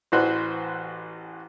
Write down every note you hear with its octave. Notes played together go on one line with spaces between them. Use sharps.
A1 E3 F#4 B4 C5